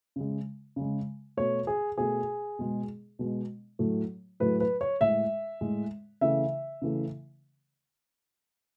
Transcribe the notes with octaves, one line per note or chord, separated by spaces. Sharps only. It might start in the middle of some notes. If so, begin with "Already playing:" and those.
C#3 G#3
C#3 G#3
B2 A3 C#5
G#4
B2 A3 G#4
B2 G#3
B2 G#3
A2 F#3 A3
A2 F#3 A3 B4
B4
C#5
A2 G#3 E5
A2 G#3
C#3 E3 A3 E5
C#3 E3 A3